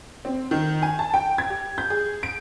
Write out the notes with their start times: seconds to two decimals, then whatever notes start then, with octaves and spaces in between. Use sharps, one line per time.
0.25 C4
0.51 D#3
0.82 G#5
0.99 A5
1.14 G5
1.38 G#6
1.50 G4
1.78 G6
1.90 G#4
2.23 D7